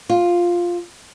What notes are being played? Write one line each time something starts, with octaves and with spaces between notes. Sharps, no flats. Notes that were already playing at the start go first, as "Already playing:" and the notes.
F4